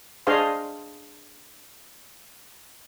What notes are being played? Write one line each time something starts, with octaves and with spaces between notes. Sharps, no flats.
D4 G#4 C5 D#5 F5 C6